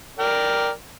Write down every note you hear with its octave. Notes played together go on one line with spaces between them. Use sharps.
A#4 D5 G5